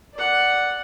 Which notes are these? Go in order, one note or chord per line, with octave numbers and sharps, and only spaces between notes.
D5 F#5